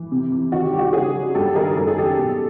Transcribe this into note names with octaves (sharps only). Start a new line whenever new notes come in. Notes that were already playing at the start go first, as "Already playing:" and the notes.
Already playing: E3
C3
E3
D#3 F#4
G4
G3 G4
F#4
G4
C#3 F#4 G#4
F#3
G2 G4 A4
D#3 G#4 A#4
F#2 A4
G#4
D#3 G4 A4
B2